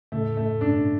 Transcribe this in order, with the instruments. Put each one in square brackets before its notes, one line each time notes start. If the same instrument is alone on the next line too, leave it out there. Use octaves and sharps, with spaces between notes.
[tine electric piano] A2 C#3 [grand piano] A3
[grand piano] A3
[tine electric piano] G2 B2 [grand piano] D4